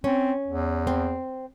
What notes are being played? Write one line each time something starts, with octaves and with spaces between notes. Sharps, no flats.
C4 C#4
E2
C4